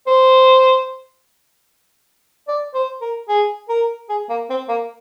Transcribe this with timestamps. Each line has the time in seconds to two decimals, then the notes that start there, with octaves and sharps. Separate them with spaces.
0.07 C5
2.48 D5
2.75 C5
3.01 A#4
3.29 G#4
3.69 A#4
4.09 G#4
4.30 A#3
4.50 C4
4.69 A#3